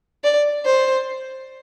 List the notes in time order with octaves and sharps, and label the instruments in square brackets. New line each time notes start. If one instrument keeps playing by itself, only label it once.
[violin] D5
C5